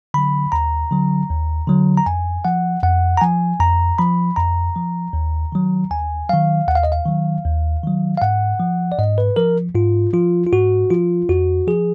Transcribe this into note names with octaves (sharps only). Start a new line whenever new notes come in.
D3 F#3 B5
D#2 A#5
D3 F#3
D#2
D3 F#3
A#5
F2 G#5
F3 F#5
F2 F#5
A#5
F3 G#5
F2 A#5
F3 B5
F2 A#5
F3
D#2
D#3 F#3
D#2 G#5
D#3 F#3 F5
D#2 F#5
F5
D#5
F5
D#3 F#3
D#2
D#3 F#3
F5
G#2 F#5
F3
D5
G#2 D#5
B4
F3 A#4
G#2 F4
F3 F4
F4
G#2 F#4
F3 F4
F2 F#4
F3 G#4